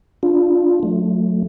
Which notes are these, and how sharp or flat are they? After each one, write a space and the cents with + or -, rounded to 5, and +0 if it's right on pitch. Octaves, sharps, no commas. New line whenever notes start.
D4 +0 F4 +10
F#3 -30 A3 +0